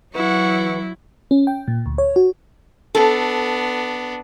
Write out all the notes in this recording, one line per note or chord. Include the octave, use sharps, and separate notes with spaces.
E3 F#3 E4 F#5 C#6
C#4
G5
A#2
D2
C#5
F#4
B3 D4 A4